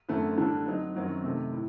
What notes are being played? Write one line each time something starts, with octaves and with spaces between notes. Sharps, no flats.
F#2 D3 A3 C4
D3 G3 D4 A4
F#3 C4 D#4
F#2 D#3 F#3 C4 F#4
C3 D#3 A3
A2